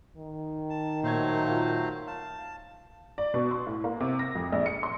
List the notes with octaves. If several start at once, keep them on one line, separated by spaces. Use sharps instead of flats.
D#3
A5
A#2 F#3 A3 C5 G#6
F4 F5
F5 A5
D5
B2
C6
A2
A#3
C3
A#6
F2
A#1
C#7
C6